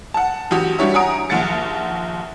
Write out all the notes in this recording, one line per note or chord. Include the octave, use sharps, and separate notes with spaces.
F#5 A5
A1 F#4 G4
G3 D4 F#4 G4 C#5 E5
F#5 G#5 A#5 D#6 D7
A#1 D#2 F#5 A6 C#7